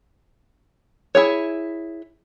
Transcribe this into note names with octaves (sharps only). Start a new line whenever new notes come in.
E4 G#4 C#5